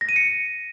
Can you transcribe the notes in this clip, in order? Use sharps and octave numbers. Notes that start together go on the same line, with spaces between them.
A#6
D#7
C#7